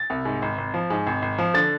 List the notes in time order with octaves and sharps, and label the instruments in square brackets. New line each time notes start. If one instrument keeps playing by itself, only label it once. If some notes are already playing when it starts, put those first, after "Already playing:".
Already playing: [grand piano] A6
C2
G#2
G#1
G#1
F3
G#2
G#1
G#1
F3
D3 A6